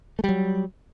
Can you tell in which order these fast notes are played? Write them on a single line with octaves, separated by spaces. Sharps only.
A3 G3 F#3